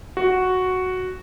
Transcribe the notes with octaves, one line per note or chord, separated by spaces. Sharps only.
F#4